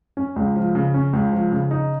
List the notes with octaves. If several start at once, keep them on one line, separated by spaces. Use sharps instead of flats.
C#4
C#2
F3
C#3
C#4
C#2
F3
C#3
D#4